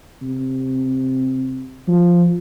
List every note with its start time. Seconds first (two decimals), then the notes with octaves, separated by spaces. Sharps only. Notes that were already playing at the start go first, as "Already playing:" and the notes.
0.22 C3
1.88 F3